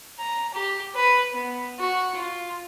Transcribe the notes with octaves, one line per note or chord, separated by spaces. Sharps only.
A#5
G4
B4
B3
F#4
F4